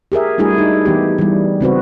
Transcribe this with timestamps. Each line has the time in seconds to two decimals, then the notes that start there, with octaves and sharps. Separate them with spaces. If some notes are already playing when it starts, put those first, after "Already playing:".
0.12 G4 G#4 A#4 E5
0.38 G3 A3 D4 E4 F#4 G#4
0.58 D#4
0.85 E3 B3 G4
1.18 E3 G3
1.61 C#3 C4 F#4 B4